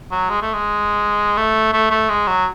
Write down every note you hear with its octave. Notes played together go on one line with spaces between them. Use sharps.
F#3
G#3
A3
G#3
A3
A3
A3
G#3
F#3